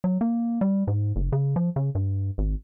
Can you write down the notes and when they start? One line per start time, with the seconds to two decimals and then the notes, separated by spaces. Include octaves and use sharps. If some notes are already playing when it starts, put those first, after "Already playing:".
0.04 F#3
0.21 A#3
0.61 G3
0.87 G#2
1.16 F#1
1.32 C#3
1.56 F3
1.76 C#3
1.95 G2
2.38 G#1